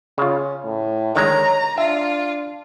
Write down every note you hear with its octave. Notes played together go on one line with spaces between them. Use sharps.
C#3 C#4 F4
A2
D3 D#3 G#3 C#5 A#5
D4 F4 E5